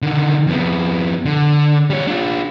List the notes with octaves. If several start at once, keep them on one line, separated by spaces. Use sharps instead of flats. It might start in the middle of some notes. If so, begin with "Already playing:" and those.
D3 D#3
F2 B3
D3
G3 C#5
D4 F4